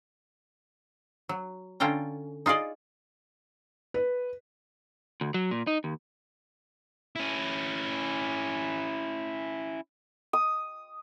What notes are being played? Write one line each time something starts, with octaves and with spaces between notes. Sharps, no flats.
F#3
D3 C#4 F4 A4 G5 A#5
D#4 F4 G#4 D5 D#5
B4
D2
F#3
A#2
D#4
D#2
C#4 E4
D#6